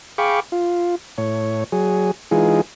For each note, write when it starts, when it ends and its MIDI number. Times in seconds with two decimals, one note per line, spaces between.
0.18 0.40 68
0.18 0.40 77
0.18 0.40 79
0.18 0.40 83
0.18 0.40 85
0.18 0.40 86
0.52 0.95 65
1.18 1.64 45
1.18 1.64 73
1.72 2.11 54
1.72 2.11 68
2.31 2.61 52
2.31 2.61 56
2.31 2.61 63
2.31 2.61 65
2.31 2.61 68